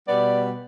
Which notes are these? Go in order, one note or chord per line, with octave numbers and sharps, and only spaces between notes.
B2 G3 B3 D5